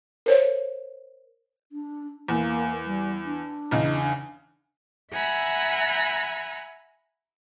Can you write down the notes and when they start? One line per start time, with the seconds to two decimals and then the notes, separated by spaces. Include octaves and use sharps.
0.26 A#4 C5 C#5
1.72 D4
2.28 E2 A#3
2.86 G3
3.26 D4
3.71 E2 C#3 D#4
5.12 E5 F#5 G#5 A#5 B5 E6